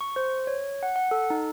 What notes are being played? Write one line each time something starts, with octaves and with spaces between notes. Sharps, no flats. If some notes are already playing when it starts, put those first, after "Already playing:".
C#6
C5
C#5
F#5
F#5
A4
D#4